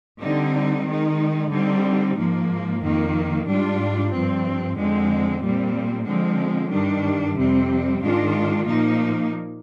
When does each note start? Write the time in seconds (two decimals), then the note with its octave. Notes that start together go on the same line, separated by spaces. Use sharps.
0.22 D3 G3 C4 D#4
0.88 D#3 G#3 D#4
1.52 D3 G3 C4 D#4
2.18 G#2 F3 A#3
2.82 F2 D#3 A#3
3.48 G#2 G3 D4 F4
4.13 G2 F3 C4
4.77 F2 D3 G#3 C4
5.42 A#2 G3 C4
6.07 D3 F3 G#3 C4
6.72 G2 D#3 G3 D4
7.37 F2 C3 G3 C4
8.02 G#2 D#3 G#3 D4 F4
8.67 A#2 F3 A#3 D#4